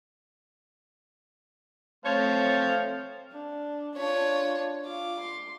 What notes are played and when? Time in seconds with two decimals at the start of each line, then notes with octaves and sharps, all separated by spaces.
2.06 A3 C4 C5 C#5 F5 A5
3.32 D4
3.96 D4 F4 C#5
4.86 F4 D6
5.21 C6